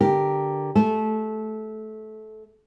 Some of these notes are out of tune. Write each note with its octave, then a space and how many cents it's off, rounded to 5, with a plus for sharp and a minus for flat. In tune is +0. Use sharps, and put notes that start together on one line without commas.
D3 +0 G4 +0 A#4 +0
A3 -20 A5 -20